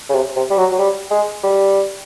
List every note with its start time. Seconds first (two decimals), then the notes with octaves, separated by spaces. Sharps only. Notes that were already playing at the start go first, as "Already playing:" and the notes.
0.09 C#3
0.14 C3
0.36 C3
0.50 G3
0.57 F#3
0.72 F#3
0.79 G3
1.11 G#3
1.43 G3